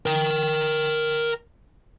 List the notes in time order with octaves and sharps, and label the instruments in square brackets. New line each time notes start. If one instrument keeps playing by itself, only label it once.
[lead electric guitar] A#4 G5